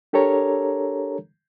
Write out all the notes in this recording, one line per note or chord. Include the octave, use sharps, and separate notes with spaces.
D4 G4 A4 A#4 C#5 A#5